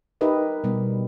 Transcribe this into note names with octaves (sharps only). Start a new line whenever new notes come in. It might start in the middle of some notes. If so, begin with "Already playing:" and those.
D#4 G4 A#4 B4 D#5 E5
B2 G3